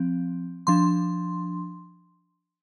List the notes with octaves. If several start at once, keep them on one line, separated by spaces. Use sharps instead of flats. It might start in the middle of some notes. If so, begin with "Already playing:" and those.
Already playing: F3 C4
F3 D4 C6